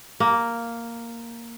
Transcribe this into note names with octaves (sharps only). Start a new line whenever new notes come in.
A#3